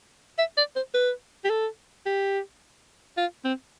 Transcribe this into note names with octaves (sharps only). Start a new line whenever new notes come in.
E5
D5
C5
B4
G4
A4
G4
F4
C4